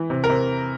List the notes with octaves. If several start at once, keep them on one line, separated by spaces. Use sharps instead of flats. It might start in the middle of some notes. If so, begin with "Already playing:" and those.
Already playing: E3
C3
A#4
C3